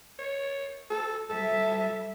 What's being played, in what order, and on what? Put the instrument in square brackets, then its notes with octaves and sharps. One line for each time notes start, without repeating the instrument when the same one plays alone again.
[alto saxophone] C#5
A4
[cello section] G3 E5 [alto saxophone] A4